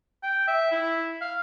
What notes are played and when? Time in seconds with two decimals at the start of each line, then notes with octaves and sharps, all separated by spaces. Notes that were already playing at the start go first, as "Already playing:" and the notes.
0.23 G5
0.48 E5
0.72 E4
1.21 F5